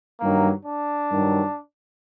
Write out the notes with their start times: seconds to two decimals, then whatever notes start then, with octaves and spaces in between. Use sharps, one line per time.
0.20 G2 D#3 F#3 A#3
0.65 D4
1.10 G2 D#3 F#3